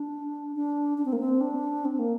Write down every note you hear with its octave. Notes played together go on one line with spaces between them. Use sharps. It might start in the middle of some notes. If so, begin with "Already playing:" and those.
Already playing: D4
D4
D4
C4
A#3
C4
D4
C4
A#3